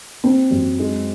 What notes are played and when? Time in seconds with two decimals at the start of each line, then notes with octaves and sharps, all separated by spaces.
0.24 C4
0.51 F#2
0.79 G#3